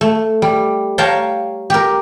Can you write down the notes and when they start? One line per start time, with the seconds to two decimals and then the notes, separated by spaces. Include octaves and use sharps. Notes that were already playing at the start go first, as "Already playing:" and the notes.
0.01 A3
0.42 G3
0.98 C#5 F5 G5 A5 A#5
1.70 G4 A#4